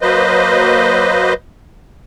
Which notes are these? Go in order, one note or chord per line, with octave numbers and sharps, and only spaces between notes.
F#3 A#3 B4 C5 D#5